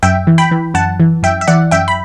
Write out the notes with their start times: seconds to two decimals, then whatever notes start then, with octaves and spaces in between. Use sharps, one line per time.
0.03 F#2 E5 G5
0.27 E3
0.38 G5 B5
0.51 E3
0.74 F#2 F#5 A5
1.00 E3
1.23 F#2 E5 G5
1.41 E5
1.48 E3 D5 F#5
1.71 F#2 E5 G5
1.88 B5